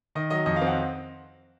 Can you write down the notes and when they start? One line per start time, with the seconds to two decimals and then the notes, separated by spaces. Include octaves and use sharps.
0.15 D#3 D#5
0.30 F#3 D#5
0.46 F2 D#5
0.56 F5
0.62 C4
0.67 F#5